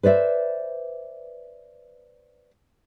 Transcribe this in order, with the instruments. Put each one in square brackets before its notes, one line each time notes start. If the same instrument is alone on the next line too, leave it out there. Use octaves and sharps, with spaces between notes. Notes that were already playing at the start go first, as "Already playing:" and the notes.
[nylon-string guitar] B4 C5 D5 E5